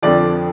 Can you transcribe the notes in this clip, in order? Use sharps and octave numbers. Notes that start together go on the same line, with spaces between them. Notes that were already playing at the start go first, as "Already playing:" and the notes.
F2 D3 F3 D5